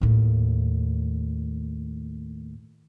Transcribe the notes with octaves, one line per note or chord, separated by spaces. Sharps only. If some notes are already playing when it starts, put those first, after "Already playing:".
D#2 A2